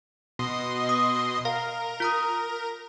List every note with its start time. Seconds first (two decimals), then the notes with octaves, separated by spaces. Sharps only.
0.39 B2 D#5 C6
0.89 D#6
1.45 A#4 F5
2.00 F4 A#5 D#6